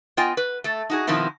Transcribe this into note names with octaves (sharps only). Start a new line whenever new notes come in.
B3 F4 D#5 G5 G#5
B4
A3 A4
D#4 F#4 G#4
B2 D#3 F3 C4 D#4 E4